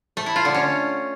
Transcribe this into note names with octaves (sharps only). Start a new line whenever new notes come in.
A3
E4
F4
D3
C#4